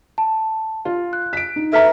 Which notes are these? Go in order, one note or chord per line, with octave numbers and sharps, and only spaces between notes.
A5
F4
F#6
B6 D7
D#4
A4 B4 E5 A#5 F6 B6